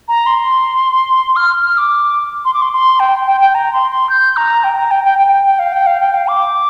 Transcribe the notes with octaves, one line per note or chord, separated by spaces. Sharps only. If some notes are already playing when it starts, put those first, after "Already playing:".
A#5
C6
F6
F6
D6
C6
D6
C6
C6
G5
G5
G5
A#5
C6
C6
G6
A#5
G5
A#5
G5
G5
G5
G5
G5
F5
G5
F5
G5
F5
D6